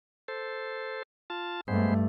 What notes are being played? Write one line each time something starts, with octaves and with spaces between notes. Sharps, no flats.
A4 C5
F4 A5
G2 G#3 A3 B3 C5